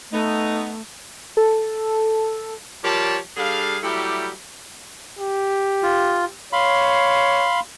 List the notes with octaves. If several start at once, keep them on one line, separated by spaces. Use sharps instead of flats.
A3 B3 D#4
A4
F3 G3 G4 A#4 C#5 A5
G3 D4 G#4 A4 F5
F#3 G3 A3 E4 G4
G4
F4
C#5 F5 B5 C6